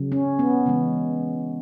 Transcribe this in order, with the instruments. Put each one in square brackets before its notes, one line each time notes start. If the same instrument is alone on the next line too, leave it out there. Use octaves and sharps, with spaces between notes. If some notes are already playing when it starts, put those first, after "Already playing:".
Already playing: [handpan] C#3 F#3
C#4
B3
C#3 E3 G#3